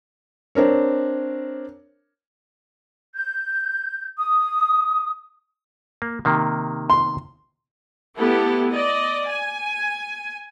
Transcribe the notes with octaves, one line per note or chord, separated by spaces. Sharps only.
C4 D4 A#4 C#5
G6
D#6
A#3
C3 D#3 A#3
C6
A3 B3 E4 G4 A4
D5 D#5
G#5